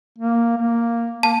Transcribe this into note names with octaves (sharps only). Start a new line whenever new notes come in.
A#3
A#3
A#3 A5